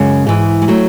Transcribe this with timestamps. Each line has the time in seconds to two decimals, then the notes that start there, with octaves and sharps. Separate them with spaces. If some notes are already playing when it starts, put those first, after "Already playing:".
Already playing: F#2 C#3 G#3
0.27 G#2 E3
0.62 G#3
0.68 F#3 A3